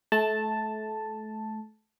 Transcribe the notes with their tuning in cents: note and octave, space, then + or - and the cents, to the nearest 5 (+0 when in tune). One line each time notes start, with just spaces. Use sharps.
A3 -30 A5 +0